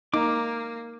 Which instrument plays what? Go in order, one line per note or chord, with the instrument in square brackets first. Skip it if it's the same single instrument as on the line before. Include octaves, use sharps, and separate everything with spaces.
[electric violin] A#3 [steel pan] D#4 [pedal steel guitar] D6